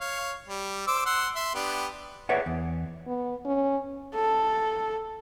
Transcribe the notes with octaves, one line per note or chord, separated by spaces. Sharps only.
C#5 F5
G3
C5 D6 E6
F#5 C6 E6
E5 C6
B3 D4 G4
G#4 B4 C#5 D5 E5 F#5
E2
B3
C#4
A4